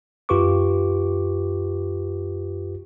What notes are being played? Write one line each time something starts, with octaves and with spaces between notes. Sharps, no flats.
F#2 F4 G4 B4 C#6 D6